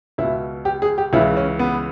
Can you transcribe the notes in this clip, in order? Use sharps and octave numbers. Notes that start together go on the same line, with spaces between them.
C#2 B2 E4
G4
G#4
G4
C#2 C#3 E3 E4
C#4
B3